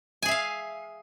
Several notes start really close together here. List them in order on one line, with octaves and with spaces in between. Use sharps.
G#5 G#4 E5 F5